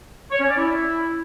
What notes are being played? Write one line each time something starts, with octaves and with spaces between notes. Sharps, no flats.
C#5
C#4
D5
E4